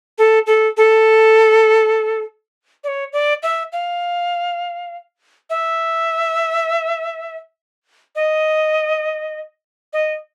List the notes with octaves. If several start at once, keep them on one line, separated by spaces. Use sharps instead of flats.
A4
A4
A4
D5
C#5
D5
E5
F5
E5
D#5
D#5